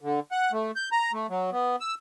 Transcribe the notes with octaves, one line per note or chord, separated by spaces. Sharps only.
D3
F#5
A3
G6
A#5
A3
F#3
B3
E6